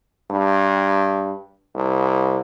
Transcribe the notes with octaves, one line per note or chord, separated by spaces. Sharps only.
G2
C2